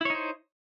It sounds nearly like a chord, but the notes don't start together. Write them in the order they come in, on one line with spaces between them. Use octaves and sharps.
E4 C#5 D#4 C5